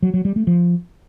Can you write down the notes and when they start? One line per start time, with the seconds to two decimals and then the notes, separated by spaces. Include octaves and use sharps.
0.02 F#3
0.14 F#3
0.25 G3
0.36 A3
0.47 F3